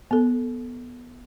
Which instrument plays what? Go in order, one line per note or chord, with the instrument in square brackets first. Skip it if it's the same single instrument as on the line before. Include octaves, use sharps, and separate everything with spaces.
[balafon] B3 A4